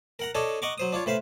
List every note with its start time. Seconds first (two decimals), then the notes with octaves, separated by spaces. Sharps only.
0.19 A#4 F#5 A#5
0.35 D4 A4 C#5 D#5
0.62 D#5 F#5 A#5 C#6 D6
0.78 F#3 C5 D#6
0.93 D4 F4 C#5
1.06 A2 B4 C5 F5